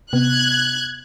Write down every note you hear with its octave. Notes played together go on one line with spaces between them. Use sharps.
C3 B3 F#6 G#6